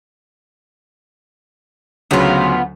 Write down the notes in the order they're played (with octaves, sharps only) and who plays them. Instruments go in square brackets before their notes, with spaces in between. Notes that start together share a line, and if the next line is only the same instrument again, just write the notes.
[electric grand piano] D2 C#3 F#3 [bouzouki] B3 F4